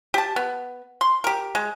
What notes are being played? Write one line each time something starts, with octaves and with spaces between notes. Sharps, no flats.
G4 A5
B3
C6
G4 A#4
G#3